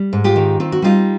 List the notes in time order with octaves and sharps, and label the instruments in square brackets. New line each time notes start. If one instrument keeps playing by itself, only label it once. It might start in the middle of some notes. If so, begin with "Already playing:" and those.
Already playing: [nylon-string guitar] G3
G#2
F4 G4
D#3
C4 F4
F#4
G3 D#4 F4